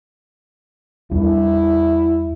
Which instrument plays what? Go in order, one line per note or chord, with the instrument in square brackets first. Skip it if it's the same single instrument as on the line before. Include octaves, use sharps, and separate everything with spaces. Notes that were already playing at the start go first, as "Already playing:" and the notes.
[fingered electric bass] E2 G3 D4 [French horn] E4